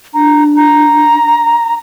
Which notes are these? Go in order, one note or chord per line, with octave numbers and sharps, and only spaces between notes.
D4 A#5
A#5